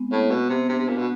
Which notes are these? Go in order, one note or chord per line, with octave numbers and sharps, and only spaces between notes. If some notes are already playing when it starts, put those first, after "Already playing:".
Already playing: G#3 B3 C4
A2 A#3
B2 B3
C3
C3 D4
C3
A#2
B2